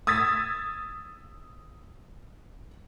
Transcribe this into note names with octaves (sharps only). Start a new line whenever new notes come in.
D#6 E6 G#6 A6 B6